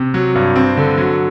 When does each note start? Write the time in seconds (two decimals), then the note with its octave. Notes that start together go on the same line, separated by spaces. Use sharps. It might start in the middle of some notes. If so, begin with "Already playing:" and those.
Already playing: C3
0.14 F#3
0.35 G2
0.56 C4
0.77 D3
0.98 F#3